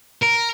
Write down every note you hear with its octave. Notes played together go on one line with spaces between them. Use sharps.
A#4